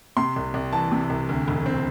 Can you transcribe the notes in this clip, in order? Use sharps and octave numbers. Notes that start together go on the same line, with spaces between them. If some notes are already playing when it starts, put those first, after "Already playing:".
C3 C6
C2
C2
E3 A5
C3
C2
D2
E1
C4